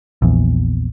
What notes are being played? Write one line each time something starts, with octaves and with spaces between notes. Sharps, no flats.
A#1 E2